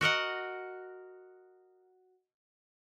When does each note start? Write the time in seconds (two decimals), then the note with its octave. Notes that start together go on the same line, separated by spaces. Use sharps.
0.01 F#4 A#4 D#5 F#5